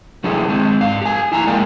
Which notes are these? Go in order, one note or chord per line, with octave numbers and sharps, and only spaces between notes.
F#3 A3 C#4 E4 G4 G#4
G#3 C4
G#2 F5
G4 G#5
E4 G#5 A#5
G#3 A#3 A#4 D5 F5 G5